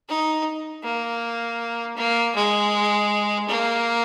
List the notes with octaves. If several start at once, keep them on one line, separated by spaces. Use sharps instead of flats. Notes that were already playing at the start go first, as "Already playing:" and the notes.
D#4
A#3
A#3
G#3
A#3